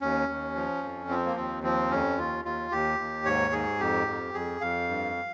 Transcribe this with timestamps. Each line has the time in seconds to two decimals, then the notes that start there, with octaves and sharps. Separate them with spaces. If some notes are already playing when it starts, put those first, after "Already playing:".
0.01 D#2 C#4
0.29 D#2
0.55 F3
0.83 F2
1.09 F3 C4
1.26 A#3
1.37 D#2 C4
1.63 F3 C4
1.91 F2 C#4
2.18 D#2 F4
2.44 D#2 F4
2.72 D#2 G4
2.99 D#2
3.26 G#2 C#5
3.53 G#2 G#4
3.80 F2 G4
4.07 F2
4.34 F2 G#4
4.61 F2 F5
4.88 G2